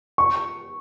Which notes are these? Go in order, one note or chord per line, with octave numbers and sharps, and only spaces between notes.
C#6